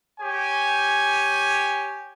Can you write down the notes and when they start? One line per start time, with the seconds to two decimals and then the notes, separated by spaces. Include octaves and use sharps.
0.20 G4 C#5 G#5